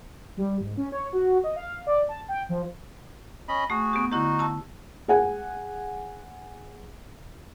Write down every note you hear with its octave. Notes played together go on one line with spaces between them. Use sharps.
G3
G#2
C#4
C#5
F#4
D#5
F5
D5
A5
G5
F3
C#4 D#5 B5
A3 F#4 G#4
B3 G4
D3 D#4 E4 F#4 G4
A5 E6
G#4 F#5 G#5